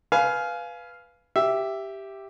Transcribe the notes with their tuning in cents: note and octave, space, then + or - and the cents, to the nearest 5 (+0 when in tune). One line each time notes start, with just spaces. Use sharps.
B4 +0 F5 -5 G#5 +20
G4 +0 E5 +5